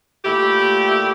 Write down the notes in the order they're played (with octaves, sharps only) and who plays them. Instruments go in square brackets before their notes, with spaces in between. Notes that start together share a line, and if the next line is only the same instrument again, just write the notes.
[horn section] A#2 A3 E4 G4